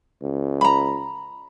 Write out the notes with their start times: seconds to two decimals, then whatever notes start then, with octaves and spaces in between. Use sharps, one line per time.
0.22 C#2
0.61 A#5 B5